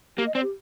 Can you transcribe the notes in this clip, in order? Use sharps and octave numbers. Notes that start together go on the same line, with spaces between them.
A#3 G4
D#5
C4 D5
G4